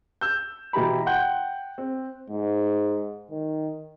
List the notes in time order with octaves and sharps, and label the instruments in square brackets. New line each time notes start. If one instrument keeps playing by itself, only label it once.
[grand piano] E6 G6
B2 E3 G4 A#5 B5
F#5 G5 C6 F#6 G6
C4
[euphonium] G#2
D#3